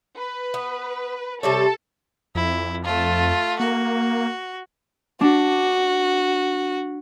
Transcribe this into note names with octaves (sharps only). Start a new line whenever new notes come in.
B4
B3
C3 G3 A4 C#5 A5
F2 E4
A3 F4
A#3 F#4
D4 F#4